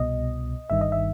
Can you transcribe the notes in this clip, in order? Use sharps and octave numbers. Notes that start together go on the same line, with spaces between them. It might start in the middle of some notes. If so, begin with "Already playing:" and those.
Already playing: C2 B2 D#5
G1 G2 D#3 E5
D#5
E5